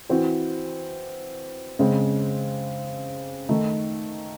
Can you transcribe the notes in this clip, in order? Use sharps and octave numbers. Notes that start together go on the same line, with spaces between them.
E3 C4 F#4
C#3 G#3 C4
D#3 A3 D#4